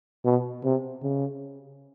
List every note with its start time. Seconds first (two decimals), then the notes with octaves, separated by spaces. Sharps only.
0.25 B2
0.64 C3
1.02 C#3